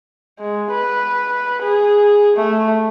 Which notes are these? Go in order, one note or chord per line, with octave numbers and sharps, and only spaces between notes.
G#3
B4
G#4
A3